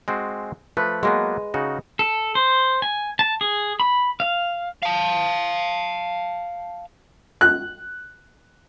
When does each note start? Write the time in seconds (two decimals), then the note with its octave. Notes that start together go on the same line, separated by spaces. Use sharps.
0.08 G#3 C4 F#4
0.77 F3 A3 B4
1.03 F#3 G#3 A#3 B3
1.54 C#3 D#4 F#4
1.99 A4
2.35 C5
2.82 G#5
3.19 A5
3.41 G#4
3.80 B5
4.20 F5
4.82 F5 A5
7.41 F#6